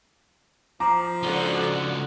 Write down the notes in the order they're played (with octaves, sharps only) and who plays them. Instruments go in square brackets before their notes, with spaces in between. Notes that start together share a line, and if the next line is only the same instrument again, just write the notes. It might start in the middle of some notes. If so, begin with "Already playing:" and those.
[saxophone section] F3 [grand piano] A#5 D6
[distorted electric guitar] C#2 D#4 [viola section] D3 F#4 F#5